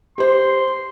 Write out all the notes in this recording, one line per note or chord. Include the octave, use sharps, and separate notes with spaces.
G4 C5 C6